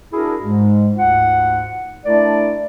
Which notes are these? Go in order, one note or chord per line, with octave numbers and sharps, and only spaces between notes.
D4 E4 F#4 G#4 A#4
G#2 G#3
D2 G#2 D#4 F4 F#5
A3 D4 E4 A#4 D5